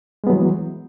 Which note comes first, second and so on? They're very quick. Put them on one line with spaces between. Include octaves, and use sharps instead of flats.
G#3 B3 F#3 E3